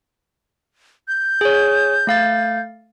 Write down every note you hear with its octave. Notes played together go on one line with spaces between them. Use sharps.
G6
G#4 C#5
A3 F5 A6